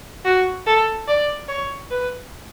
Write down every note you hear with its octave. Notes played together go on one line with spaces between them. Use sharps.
F#4
A4
D5
C#5
B4